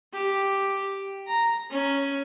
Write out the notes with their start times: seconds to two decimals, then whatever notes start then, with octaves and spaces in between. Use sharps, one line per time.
0.13 G4
1.27 A#5
1.71 C#4